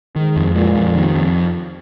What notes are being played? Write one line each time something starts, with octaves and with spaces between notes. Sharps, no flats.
G#2 D#3
F2
A#2 G#3
F2
C3 D#3
F2